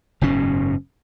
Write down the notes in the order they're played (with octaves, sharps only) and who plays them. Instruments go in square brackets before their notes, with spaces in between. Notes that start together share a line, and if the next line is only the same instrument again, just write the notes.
[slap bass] F#1 G#2 B2 C#4